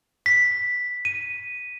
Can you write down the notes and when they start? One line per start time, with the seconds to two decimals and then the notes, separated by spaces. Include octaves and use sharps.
0.26 B6
1.05 D#7